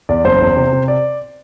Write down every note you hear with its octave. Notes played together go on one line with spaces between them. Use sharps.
E2 D5
F#1 C5
E2
C3
C3
D5